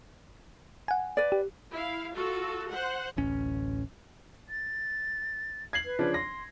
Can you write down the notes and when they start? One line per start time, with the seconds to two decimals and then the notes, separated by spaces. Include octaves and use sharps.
0.88 F#5 G#5
1.17 B4 D5
1.32 G4
1.72 E4 F5
2.15 F4 F#4 A4
2.71 C5 F#5
3.17 D1 A1 C#4
4.49 A6
5.73 G#6 C7 F#7
5.85 B4
5.99 C#3 F3 D4
6.14 C6 A#6